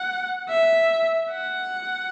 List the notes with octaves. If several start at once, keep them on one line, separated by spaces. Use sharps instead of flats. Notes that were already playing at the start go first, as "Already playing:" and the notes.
Already playing: F#5
E5
F#5